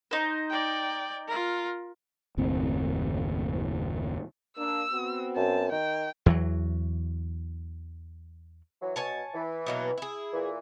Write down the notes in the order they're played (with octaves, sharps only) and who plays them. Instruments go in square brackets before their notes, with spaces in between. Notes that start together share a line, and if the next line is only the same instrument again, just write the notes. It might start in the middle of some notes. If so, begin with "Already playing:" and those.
[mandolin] D#4 C5
[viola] D5 G5
F4 A#4
[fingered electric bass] F#1 D#2 A2 C4
[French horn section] A#3 D4 [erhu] E6
[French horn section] B3 C4 F#4
[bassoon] F#2 [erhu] A5
[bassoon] D#3 [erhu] G5
[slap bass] E2 E3 F#3
[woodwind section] E3 F#3
[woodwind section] B2 [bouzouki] C#5 G#5 A5
[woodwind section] E3
[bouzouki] B2 F#3 A#3
E4 G#4
[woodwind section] A#2 E3